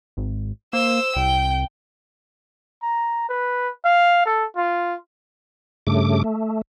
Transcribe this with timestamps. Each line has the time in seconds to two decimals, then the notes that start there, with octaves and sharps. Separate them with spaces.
0.17 G#1
0.73 A#3 C5 E6
1.16 C2 G5
2.83 A#5
3.29 B4
3.85 F5
4.26 A4
4.57 F4
5.87 G2 C#3 A3 D6
6.24 A3